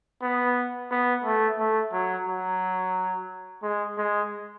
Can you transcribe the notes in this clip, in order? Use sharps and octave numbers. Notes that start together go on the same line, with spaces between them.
B3
B3
A3
A3
F#3
F#3
G#3
G#3